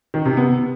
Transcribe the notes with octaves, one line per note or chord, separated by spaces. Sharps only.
D#3
C3
B3